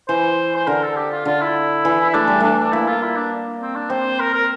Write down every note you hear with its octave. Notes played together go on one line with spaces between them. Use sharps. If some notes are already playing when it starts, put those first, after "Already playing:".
E3 C5
C5
D3 A#4
A4
G4
F4
D3 F4
E4
E3
E4
A3 D4
G3
A3 D4
D4
A#3 E4
F4
E4
D4
C4
D4
C4 C5
A#4
A#4